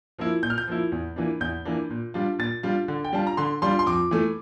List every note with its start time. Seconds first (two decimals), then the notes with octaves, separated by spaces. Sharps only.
0.18 F3 A#3 E4
0.43 A#2 G6
0.50 F6
0.58 G6
0.67 F3 A#3 E4
0.92 E2
1.16 E3 A#3 D4
1.40 E2 G6
1.65 E3 A#3 D4
1.90 A#2
2.14 G3 D4 F4
2.39 A#2 A6
2.63 G3 D4 F4
2.88 D3
3.04 G5
3.13 G3 D4 F4 A5
3.27 A#5
3.37 D3 C6
3.62 G3 D4 F4 C6
3.79 C6
3.86 F2 D6
4.11 E3 A3